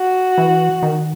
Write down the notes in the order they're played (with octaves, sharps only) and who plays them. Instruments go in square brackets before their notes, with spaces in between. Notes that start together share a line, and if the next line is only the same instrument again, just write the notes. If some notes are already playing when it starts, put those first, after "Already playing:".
Already playing: [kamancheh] F#4
[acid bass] E3
D#3